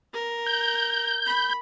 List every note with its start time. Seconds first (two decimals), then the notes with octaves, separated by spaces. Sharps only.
0.13 A#4
0.46 G6
1.26 B5